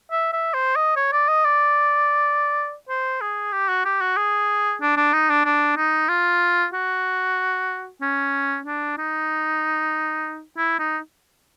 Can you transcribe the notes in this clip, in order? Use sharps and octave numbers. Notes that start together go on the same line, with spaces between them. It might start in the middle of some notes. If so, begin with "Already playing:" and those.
E5
E5
C5
D#5
C#5
D5
D#5
D5
C5
G#4
G4
F#4
G4
F#4
G#4
D4
D4
D#4
D4
D4
D#4
F4
F#4
C#4
D4
D#4
E4
D#4